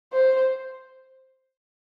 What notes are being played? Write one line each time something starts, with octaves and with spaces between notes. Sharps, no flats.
C5